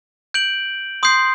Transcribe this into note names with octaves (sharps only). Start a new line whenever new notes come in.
G6 D7 F#7
C6 D#6 G6 C7